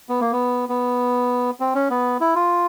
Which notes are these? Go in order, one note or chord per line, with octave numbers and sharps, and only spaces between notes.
B3
A#3
B3
B3
C4
C#4
B3
E4
F4